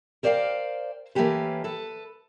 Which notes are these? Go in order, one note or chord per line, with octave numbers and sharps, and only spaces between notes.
A#4 C5 D5 E5 F5 G5
E3 A3 A#3 C#4 G4 B4
A4 B4